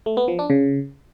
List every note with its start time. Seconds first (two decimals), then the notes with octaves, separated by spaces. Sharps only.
0.06 A3
0.17 B3
0.28 F3
0.39 D4
0.50 C#3